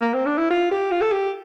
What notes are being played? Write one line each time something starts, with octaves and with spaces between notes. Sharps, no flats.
A#3
C4
D4
E4
F4
G4
F4
A4
G4